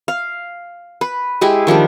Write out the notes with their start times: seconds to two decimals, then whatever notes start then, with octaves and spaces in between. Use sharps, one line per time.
0.08 F5
1.01 B4
1.41 G#3 E4 G4 B4
1.67 D#3 F3 G3 D4